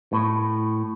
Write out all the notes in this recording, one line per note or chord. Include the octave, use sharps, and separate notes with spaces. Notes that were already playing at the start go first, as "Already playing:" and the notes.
A2